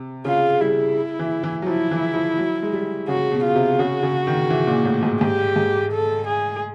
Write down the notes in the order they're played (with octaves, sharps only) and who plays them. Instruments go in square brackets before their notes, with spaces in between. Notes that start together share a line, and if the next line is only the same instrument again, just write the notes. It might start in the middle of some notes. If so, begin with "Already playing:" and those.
Already playing: [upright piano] C3
[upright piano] C#3 [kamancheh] F4
[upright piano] G3 [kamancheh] E4
[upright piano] E3
E3
F#3
[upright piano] F3 [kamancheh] E4
[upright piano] E3
F3
F#3
G#3
G3
[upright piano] C#3 [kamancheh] F#4
[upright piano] B2
[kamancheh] F4
[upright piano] C3
[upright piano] C#3 [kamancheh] F#4
[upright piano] C#3
D#3
E3
A#2
A2
G#2
[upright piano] G#2 [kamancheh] G4
[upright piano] G#2
[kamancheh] A4
G#4